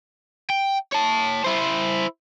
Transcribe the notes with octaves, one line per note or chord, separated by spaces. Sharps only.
G5
C#5 A5
E4 C5